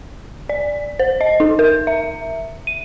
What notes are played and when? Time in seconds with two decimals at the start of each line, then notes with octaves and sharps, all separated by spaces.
0.49 D5
0.99 C5
1.21 D#5
1.40 D#4
1.59 A#4
1.87 E5
2.67 D#7